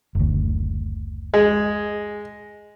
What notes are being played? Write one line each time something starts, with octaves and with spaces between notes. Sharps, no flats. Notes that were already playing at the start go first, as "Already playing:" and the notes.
F#1 D2
G#3